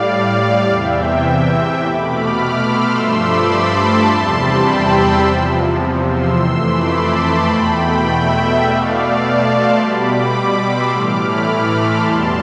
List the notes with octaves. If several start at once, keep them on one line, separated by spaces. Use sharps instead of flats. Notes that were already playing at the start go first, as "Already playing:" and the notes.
Already playing: A2 G3 D5 F5
E2 C3 E3 E5 G5
B2 A3 B5 D6
D6 F6
C6 E6
G2 F3 A3
B5 D6
A5 C6
E2 C3 G3
G5 B5
C6 E6
E2 C3 F3
C6 E6
F2 E3 A3
B5 D6
A5 C6
E2 B2 A3 G5 B5
E5 G5
B2 A3 D5 F5
F5 A5
A5 C6
B2 G3 B5 D6
C6 E6
A2 E3 A3 D6 F6
B5 D6
A5 C6
E2 B2 G3